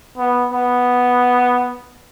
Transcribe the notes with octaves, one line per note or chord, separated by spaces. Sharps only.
B3
B3